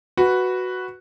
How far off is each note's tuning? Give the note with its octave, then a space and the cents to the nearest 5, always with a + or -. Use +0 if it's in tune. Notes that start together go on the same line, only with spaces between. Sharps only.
F#4 +0 B4 +0